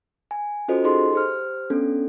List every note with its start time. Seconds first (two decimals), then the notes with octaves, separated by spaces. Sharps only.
0.31 G#5
0.68 C#4 F4 F#4 A4 C5 D#5
0.84 D#4 G#4 A4 D#5 C6
1.13 G4 C5 F6
1.70 B3 C#4 D4 A4